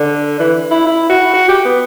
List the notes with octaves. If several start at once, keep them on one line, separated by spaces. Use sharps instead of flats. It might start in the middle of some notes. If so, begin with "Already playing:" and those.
Already playing: D3
E3
E4
E4
F#4
F#4
G4
B3